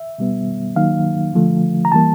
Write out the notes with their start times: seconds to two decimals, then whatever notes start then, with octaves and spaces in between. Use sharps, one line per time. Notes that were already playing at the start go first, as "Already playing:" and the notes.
Already playing: E5
0.18 B2 G3 B3
0.76 D#3 F#3 A#3 D#4 F5
1.33 D3 F3 A3
1.85 A#5
1.92 E3 G3 A#3 A5